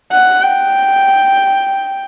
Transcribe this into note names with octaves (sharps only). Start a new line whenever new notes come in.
F#5
G5